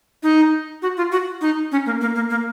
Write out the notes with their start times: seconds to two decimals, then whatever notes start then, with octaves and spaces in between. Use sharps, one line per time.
0.23 D#4
0.82 F#4
0.97 F4
1.12 F#4
1.41 D#4
1.72 C#4
1.86 A#3
2.01 A#3
2.15 A#3
2.30 A#3